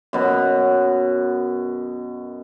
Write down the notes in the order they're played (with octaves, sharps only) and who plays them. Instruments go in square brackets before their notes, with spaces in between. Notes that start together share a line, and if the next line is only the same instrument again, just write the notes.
[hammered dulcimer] F#2 B2 B5